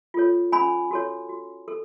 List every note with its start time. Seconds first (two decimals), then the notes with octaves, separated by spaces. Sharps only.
0.14 F4 A4 C#5
0.52 C#4 G#5 B5
0.91 F#4 A4 C#5
1.29 F#4
1.68 A4